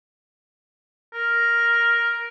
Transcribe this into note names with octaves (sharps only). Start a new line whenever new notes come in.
A#4